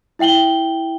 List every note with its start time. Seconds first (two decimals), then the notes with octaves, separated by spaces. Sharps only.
0.19 E4 E5 G5 F#7 G7